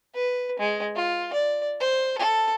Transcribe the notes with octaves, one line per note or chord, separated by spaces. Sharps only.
B4
G#3
F4
D5
C5
A4